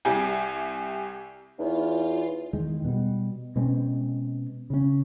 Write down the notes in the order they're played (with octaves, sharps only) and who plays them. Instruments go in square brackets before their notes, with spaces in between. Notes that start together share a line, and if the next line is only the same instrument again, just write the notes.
[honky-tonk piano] C2 G4 G#5
[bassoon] E2 [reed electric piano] D#4 B4 C#5 [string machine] F4
[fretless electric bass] E2 D#3 G#3
B2 G3
B2 G#3 C4 C#4
C#3 C#4